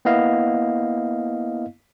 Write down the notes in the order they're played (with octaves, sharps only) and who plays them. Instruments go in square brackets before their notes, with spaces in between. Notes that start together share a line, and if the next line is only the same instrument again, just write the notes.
[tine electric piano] A#3 B3 E4 D#5 F5